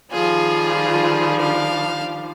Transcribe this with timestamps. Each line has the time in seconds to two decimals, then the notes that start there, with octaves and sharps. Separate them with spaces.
0.11 D#3 F3 G3 F4 G#4
1.41 D4 F5